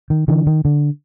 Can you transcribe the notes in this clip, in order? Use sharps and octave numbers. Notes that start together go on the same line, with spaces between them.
D#3
D3 E3
D#3
D3